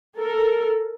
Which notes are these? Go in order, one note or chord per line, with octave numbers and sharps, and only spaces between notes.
A4 A#4